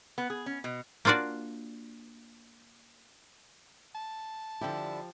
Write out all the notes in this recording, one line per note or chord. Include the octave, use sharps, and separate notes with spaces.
B3
G#4
C#4
B2
A#3 D4 F4 F#4 D5
A5
D3 F3 G3 E4 G4